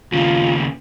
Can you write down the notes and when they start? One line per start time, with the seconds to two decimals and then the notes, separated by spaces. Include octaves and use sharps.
0.12 D#2 C#3 F4